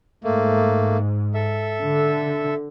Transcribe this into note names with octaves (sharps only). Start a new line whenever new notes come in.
G#2 A3 A#3
A4 E5
D3